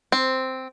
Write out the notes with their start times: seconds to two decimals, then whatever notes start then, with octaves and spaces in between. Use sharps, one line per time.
0.12 C4